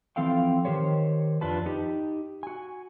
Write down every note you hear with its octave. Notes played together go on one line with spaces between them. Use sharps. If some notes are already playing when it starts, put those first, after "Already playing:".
E3 F3 C4 A4 F5 G5
D#3 F#3 G4 C5 C#5
F2 D4 F4 B4 A5
D#4 G4
F#4 G#5